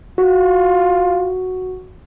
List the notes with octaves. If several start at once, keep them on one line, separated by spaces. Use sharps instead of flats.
F4 F#4